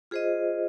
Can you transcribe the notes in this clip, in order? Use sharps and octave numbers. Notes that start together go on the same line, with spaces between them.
F4 G#4 C5 D#5